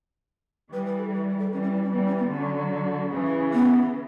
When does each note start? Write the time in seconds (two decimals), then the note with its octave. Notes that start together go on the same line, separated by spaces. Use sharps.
0.72 E3 G3 B4
0.86 B4
0.98 A4
1.12 B4
1.38 A4
1.51 E3 G3 C#4
1.62 C#4
1.73 E4
1.83 C#4
1.92 E3 G3 B3
2.05 C#4
2.18 B3
2.32 D3 F#3 C#4
3.12 C#3 E3
3.26 D4
3.53 B3